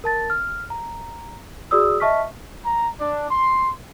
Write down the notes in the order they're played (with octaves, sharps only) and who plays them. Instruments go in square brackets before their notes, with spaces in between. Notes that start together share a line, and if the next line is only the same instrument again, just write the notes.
[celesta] A#4 A5 A6
F6
A#5
F#4 G#4 D5 D#6 E6
D#5 E5 A5 C#6 F6 B6
[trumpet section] A#5
D4
C6